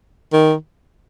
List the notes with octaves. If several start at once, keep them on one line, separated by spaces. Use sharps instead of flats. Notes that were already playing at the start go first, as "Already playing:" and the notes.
D#3